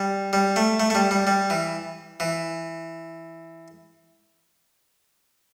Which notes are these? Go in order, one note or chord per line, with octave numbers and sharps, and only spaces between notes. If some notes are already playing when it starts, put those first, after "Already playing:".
Already playing: G3
G3
A3
A3
A3
G3
G3
G3
E3
E3